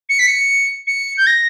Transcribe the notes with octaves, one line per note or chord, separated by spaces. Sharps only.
C#7
B6
C#7
C#7
G6
A#6